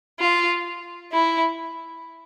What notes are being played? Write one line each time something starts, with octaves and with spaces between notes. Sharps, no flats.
F4
E4